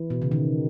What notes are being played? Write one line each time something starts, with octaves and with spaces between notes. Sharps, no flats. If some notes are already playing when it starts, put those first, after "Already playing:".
Already playing: E3
B2
C#3
D#3